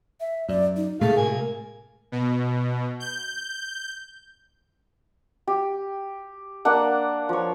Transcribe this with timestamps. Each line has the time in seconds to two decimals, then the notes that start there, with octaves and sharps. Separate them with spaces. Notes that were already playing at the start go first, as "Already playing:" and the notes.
0.20 E5
0.49 F#2 D5
0.76 D#4
1.01 A2 C3 G#3 A3 G#4 F5
1.17 A#3 G#5
2.12 B2
3.00 G6
5.47 G4
6.65 A#3 D4 F#5
7.29 F3 C#5